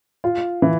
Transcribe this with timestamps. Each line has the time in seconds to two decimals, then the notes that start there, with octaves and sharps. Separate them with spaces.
0.24 F4
0.62 E3